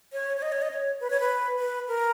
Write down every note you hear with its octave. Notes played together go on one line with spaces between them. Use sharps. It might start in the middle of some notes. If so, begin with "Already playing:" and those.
C#5
C#5
D#5
C#5
D#5
C#5
B4
C#5
B4
B4
A#4